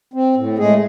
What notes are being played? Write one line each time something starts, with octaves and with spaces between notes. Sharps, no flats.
C4
A2
G#3 A3 G#4